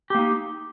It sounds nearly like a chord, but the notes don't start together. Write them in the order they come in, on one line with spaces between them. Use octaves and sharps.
G4 A#3 D#4